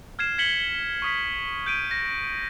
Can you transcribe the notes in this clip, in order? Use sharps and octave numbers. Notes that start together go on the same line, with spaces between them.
F6 G#6 C7 E7
G#6 B6 C#7 F#7 G7
C#6 D#6 B6
G6 D7 D#7
A#6